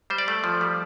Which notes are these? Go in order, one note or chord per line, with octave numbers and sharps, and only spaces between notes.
G3 C5
D5
A3
F3
G3